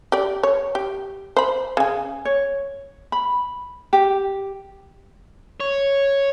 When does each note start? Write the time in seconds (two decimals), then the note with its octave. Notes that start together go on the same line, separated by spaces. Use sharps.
0.12 G4 D5
0.43 C#5
0.75 G4
1.37 C5 B5
1.77 C#3 G#5
2.25 C#5
3.12 B5
3.93 G4
5.60 C#5